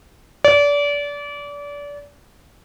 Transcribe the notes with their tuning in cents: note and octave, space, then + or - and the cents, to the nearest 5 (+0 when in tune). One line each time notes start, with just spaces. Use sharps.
D5 -30